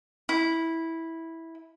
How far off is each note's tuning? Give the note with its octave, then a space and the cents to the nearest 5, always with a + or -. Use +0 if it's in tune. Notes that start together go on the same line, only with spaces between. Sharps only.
E4 -10